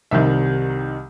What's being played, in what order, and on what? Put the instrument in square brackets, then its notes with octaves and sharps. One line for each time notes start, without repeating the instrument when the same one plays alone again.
[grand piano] C2 C3 D#3 G3 E5